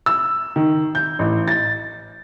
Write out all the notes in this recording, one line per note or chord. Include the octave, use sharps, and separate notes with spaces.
E6
D#3
G6
A1
A6